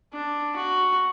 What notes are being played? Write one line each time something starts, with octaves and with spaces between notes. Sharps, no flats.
D4
F#4